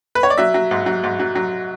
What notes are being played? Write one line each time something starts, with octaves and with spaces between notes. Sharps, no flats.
B4
C#5
D5
F#3 E5
F#3
G#2
F#3
G#2
F#3
F#3